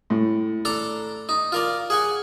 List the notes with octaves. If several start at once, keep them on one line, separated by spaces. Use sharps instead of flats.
A2
D4 A4 A#5
D#4
F4 A#4 D5
G#4 F#5 G#5